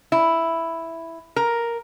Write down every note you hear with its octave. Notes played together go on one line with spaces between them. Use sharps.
E4
A#4